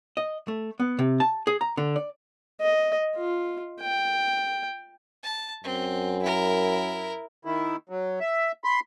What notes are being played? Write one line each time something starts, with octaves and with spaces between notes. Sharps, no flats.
D#5
A3
B3
C3
A5
G#4
A#5
D3
D5
D#5
F4
G5
A5
F#2 C4
E4 A#4
D#3 E4
F#3
E5
B5 C6